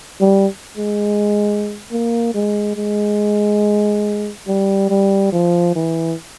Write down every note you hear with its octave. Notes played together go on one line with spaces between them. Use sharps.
G3
G#3
A#3
G#3
G#3
G3
G3
F3
E3